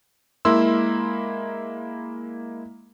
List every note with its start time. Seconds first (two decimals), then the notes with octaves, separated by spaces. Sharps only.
0.45 G#3 A#3 E4 C6 E6